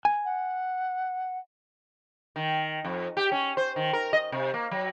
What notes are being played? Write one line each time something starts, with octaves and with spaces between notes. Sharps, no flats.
G#5
F#5
D#3
F2
G4
C#4
C5
D#3
A#4
D#5
C3
A#3
F#3